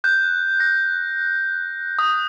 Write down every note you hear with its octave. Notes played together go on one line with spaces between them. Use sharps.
F#6 G6
A#6
D#6